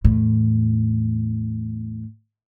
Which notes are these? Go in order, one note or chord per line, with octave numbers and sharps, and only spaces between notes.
E2 A2